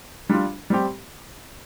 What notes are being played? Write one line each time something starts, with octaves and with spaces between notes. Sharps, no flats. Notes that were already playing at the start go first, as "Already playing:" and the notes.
G3 D4 F4
G3 C4 G4